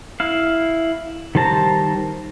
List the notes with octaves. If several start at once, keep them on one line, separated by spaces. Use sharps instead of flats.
E4 F5
D#3 G3 C5 A5 A#5